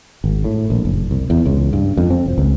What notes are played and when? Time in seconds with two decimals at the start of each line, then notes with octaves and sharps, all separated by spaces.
0.24 G#1
0.44 A2
0.70 A#1
0.85 F#1
1.11 C2
1.30 E2
1.46 C#2
1.73 G2
1.97 F2
2.10 C4
2.26 E1
2.38 C#2